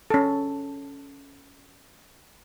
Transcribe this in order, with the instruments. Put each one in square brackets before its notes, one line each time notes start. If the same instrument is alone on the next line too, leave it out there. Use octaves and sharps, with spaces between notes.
[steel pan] C#4 A4